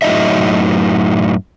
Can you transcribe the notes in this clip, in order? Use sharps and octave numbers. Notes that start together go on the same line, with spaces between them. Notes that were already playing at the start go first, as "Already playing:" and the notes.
F#2 A2 F#3 D#4 D#5 E5